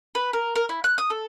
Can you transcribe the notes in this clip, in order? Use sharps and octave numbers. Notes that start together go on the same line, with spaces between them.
B4
A#4
A#4
E4
F#6
D#6
A4